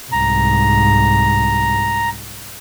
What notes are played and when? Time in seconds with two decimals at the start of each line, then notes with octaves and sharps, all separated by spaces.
0.12 C2 G#2 A#5